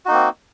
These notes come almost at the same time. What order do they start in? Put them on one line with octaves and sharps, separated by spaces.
F#4 D#4 A#3 C4